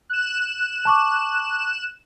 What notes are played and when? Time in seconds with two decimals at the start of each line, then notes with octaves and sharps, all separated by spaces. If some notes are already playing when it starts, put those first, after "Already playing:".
0.10 F#6 E7
0.85 A5 C#6 D6